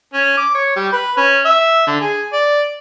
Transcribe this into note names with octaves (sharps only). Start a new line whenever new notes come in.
C#4
D6
C#5
G3
B4
C#4
E5
D3
G#4
D5